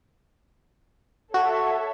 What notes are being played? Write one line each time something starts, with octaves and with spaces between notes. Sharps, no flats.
F#4 A4 C#5 E5